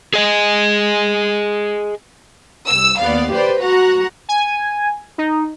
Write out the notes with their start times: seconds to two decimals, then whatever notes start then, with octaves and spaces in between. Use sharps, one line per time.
0.14 G#4 D#5
2.68 C2 E6
3.00 D#2 B3 D5 F5
3.31 G4 B4 C5 D5
3.61 F#4 F#5 A#5
4.29 G#5
5.18 D#4